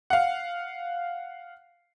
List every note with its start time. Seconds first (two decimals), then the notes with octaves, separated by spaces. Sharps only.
0.10 F5 F#5